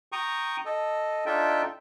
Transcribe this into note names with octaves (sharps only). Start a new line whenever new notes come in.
G5 A#5 C#6 D#6
A4 D#5
D4 D#4 F4 A4 E5 G5